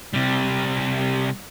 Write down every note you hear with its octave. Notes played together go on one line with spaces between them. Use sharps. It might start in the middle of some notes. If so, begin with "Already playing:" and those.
C3 G3